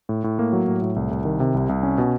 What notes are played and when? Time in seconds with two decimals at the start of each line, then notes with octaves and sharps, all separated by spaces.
0.09 A2
0.24 A2
0.39 A#3
0.53 F#3
0.68 A2
0.82 A2
0.96 C2
1.11 C2
1.25 D#3
1.40 C3
1.54 C2
1.69 C2
1.83 C#4
1.98 B2